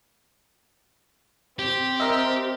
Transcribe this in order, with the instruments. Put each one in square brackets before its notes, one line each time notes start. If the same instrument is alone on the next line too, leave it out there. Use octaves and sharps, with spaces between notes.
[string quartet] C4 [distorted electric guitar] G4
[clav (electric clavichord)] A#4 D#5 E5